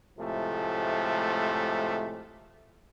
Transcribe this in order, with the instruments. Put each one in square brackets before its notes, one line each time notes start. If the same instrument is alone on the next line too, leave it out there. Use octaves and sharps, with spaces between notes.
[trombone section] A2 C3 F3 G#3 A3